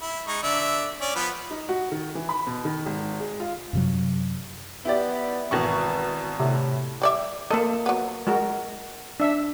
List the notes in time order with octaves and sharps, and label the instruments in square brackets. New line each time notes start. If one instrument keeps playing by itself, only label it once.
[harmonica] E4
G#3 D#4 C#6
D3 D5 E5
C#4 D5
F3 B3 B4
[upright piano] D#4
F#4
D#3
E3
B5
B2
D#3
G#1
G#3
F4
[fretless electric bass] F#2 C3 F#3
[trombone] B3 [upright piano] E4 G4 D5
[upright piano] G#1 B2 C#6 [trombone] E3
[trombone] A2 [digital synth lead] C3
[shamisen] G3 D5 E5
[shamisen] F3 D#5 [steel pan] A#3 A4
[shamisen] F#3 B3
[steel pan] G#3 F#4 A#4
D4 E5